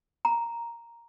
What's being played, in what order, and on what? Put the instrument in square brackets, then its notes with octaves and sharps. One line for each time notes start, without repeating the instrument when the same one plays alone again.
[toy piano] A#5